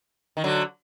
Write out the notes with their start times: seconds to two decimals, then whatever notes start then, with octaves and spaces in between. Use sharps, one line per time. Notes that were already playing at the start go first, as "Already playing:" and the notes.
0.37 D#3
0.44 D3 F#3